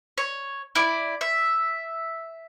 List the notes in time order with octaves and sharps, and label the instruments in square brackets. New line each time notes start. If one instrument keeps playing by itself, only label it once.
[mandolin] C#5
E4 D5
E5